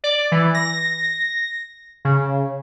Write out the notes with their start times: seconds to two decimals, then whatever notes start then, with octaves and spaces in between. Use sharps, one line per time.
0.04 D5
0.32 E3
0.54 A#6
2.05 C#3